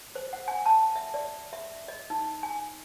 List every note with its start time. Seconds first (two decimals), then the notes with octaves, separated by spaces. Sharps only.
0.15 C5
0.33 F#5
0.48 G#5
0.66 A5
0.96 E5
1.14 D5
1.53 E5
1.88 D#5
2.10 D#4
2.43 G#5